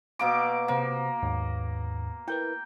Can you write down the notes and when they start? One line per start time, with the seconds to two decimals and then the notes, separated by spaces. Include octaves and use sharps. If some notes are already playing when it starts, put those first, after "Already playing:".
0.19 B2 A#3 D6
0.68 C3 A#3 C5 F#5
1.23 D#2 G#2
2.28 E4 A#4 B4 G5